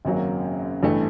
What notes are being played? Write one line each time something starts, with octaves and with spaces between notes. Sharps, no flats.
G#1 F#2 C#3 F#3 A#3
A1 G2 E3 A3